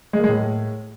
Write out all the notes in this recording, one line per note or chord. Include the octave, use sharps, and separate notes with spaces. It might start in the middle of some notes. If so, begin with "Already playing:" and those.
G#3
A#3
G#3
A2